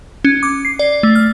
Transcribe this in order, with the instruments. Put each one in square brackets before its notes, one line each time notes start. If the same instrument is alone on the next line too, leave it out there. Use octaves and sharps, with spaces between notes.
[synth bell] C#4
D6
C7
D5
A3
F6